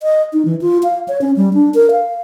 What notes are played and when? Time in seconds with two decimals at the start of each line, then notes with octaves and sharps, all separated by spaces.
0.03 D#5
0.33 D#4
0.45 E3
0.61 F4
0.83 F5
1.08 C#5
1.21 C#4
1.36 G3
1.54 D4
1.74 A#4
1.91 F5